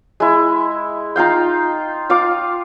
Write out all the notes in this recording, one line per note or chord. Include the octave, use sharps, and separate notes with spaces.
G#3 E4
D#4 F4 F5 G5
F4 F5 D6